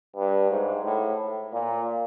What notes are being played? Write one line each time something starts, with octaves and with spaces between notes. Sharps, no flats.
G2
G#2
A2
A#2